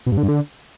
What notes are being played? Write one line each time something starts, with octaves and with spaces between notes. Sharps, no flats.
B2
G2
D3
G2
D3